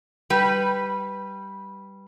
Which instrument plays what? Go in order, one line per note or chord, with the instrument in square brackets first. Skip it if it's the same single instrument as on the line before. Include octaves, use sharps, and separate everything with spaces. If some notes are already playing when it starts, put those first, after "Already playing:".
[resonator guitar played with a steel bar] G3 B4